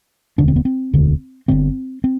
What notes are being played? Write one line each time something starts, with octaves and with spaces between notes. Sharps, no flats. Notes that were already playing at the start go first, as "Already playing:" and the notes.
E1 D2 D3 D4
C4
B3
C4
E1 D2 D3
G1 G2 D3 C4
C4